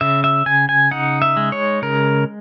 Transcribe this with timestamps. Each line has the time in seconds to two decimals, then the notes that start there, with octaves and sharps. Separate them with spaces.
0.01 C#3 E5
0.24 E5
0.46 C#3 G#5
0.69 G#5
0.91 D#4 F#5
1.22 E5
1.37 G#3
1.52 C#5
1.82 C#3 A#4